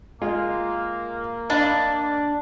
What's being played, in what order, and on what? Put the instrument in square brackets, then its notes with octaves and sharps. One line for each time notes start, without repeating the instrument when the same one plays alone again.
[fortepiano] G#3 F4 [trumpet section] A#3
[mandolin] D4 [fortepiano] D#5 F5 B5